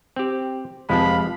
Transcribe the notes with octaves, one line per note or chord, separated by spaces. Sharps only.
C4 G4
F1 F3 G#3 F5 A5 B5